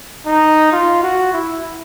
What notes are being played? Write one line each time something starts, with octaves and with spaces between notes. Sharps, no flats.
D#4
F4
F#4
E4